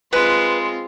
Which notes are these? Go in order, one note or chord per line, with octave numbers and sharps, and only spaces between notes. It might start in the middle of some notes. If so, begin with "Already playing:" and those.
G#3 C4 F4 B4